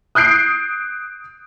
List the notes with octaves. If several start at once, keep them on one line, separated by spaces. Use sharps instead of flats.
D#6 F#6 G6 C7 D7